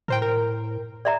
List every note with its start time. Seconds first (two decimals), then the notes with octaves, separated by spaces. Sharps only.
0.08 A2 A#4 C5 G5
0.22 A#4
1.05 D5 E5 A#5